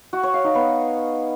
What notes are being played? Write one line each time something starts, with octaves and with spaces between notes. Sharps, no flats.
F#4
C#5
F5
D#4
B3